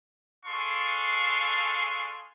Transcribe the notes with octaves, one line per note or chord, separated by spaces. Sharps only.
D4 G#4 A4 F5 C6 C#6